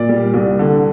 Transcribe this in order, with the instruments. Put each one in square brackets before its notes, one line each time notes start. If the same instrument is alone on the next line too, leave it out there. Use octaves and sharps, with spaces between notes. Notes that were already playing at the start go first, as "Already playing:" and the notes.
Already playing: [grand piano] A#2 D5
G3
C2
D3